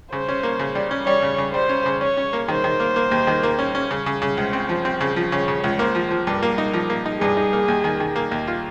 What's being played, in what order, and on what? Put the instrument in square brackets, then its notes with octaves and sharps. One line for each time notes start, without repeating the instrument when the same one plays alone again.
[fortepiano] C#3 [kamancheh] C5
[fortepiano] C#4
A#3
C#3
G3
C#4
[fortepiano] G3 [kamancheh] C#5
[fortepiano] C#3
C#3
[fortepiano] G3 [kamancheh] C5
[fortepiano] C#4
C#3
[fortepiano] C#4 [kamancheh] C#5
[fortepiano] C#4
A#3
[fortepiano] D#3 [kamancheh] C5
[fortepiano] D#3
A#3
A#3
D#2
D#3
A#3
C#4
C#4
C#3
C#3
C#3
[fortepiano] C#2 [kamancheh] C5
[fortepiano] C4
F3
C4
C#3
F3
[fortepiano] C#3 [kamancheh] C#5
[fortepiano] C#3
C#2
[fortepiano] A#3 [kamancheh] C5
[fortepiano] F3
F3
[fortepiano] G2 [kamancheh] A#4
[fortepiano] A#3
D#4
F3
A#3
D#4
[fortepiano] G2 [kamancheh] G#4
[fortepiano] D#4
A#3
D#2
D#3
D#3
A#3
D#2
F4